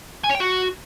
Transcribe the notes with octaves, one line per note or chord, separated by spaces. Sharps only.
G#5
C#5
G5
F#4